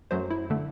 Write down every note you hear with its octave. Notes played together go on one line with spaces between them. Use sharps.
F#2 F#3 A3 C5
E4
D3 A3